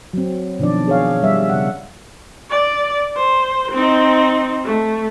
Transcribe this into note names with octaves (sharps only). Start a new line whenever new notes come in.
F#3 C4
B2 D#3 F3 D4 D5
G#4 C#5 F5
G3 E5
C#3 F#5
D5
C5
C4 D#4
A3